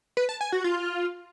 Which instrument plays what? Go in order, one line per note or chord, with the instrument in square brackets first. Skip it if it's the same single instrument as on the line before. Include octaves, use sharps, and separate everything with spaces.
[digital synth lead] B4
A5
G#5
F#4
F4